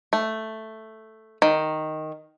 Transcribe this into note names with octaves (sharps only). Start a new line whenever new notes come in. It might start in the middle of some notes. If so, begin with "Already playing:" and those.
A3
D#3